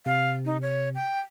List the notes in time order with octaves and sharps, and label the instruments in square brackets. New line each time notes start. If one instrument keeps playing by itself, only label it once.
[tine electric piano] C3 [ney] F5
[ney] D#4
C#5
G5